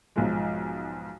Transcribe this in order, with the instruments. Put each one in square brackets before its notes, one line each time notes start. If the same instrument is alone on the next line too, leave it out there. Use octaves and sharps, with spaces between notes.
[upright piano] B1 G#2 F3 G#3